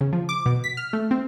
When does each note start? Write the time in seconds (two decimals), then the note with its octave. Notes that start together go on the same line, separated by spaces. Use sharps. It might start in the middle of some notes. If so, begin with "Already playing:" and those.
0.01 C#3
0.13 F3
0.29 D6
0.46 B2
0.64 B6
0.77 F6
0.93 A3
1.11 C4